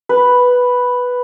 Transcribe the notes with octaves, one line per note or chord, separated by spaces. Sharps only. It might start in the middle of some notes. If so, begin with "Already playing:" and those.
B4